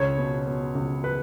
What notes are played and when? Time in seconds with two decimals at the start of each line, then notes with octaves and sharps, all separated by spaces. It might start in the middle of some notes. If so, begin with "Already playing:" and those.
Already playing: C#2 C#5
0.18 B2
0.47 B2
0.75 C#2
1.04 B4